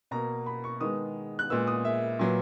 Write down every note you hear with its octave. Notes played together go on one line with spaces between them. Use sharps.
B2 A#3 A#5
B5
C#6
D#3 G#3 B3 D#6
F#6
A#2 G#3 B3 E6
D#6
E5
A#2 F#3 B3